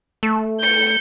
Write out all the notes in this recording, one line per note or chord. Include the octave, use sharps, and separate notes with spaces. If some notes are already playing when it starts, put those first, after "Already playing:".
A3
G6 C#7